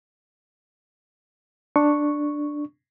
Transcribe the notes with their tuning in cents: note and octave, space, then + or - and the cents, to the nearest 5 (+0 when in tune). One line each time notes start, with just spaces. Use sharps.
D4 +5 C#6 +0